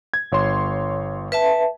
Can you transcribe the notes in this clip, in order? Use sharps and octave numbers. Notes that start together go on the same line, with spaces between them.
G#6
G1 C#5 C6
B4 E5 A5